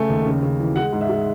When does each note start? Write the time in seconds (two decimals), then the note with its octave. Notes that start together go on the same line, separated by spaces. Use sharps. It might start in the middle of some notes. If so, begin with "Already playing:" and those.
Already playing: C#3 A3 G#5
0.09 D#2
0.26 C#3
0.43 C#3
0.60 E3
0.76 G#3 F#5
0.93 G#2
1.01 E5
1.09 G#3